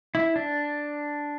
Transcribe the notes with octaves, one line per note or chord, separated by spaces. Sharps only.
E4
D4